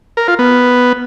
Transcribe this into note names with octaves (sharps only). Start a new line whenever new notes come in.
A#4
F4
B3